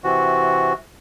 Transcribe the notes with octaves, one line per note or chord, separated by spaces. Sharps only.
C3 E3 F#4